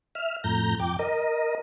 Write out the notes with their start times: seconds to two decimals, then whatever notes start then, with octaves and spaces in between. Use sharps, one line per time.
0.15 E5 F6
0.44 F2 A2 A#5 G6
0.80 F2 G5 D6
0.99 A#4 D#5